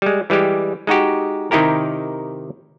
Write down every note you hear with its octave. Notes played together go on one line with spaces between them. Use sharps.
G3 G#3
E3 G3 G#3 G4
G#3 D#4 F#4 G4
C3 D#3 D#4 E4 G4 A#4